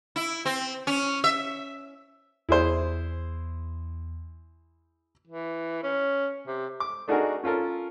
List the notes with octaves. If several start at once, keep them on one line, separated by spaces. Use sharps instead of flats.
E4
C4
C#4
E5
E2 E4 G#4 C5
E3
C#4
C3
D6
A3 D4 D#4 F#4 G#4 A#4
C#4 F4 A4 A#4